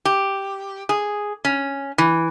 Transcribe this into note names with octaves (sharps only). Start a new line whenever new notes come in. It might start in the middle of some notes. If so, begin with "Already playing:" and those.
G4
G#4
C#4
E3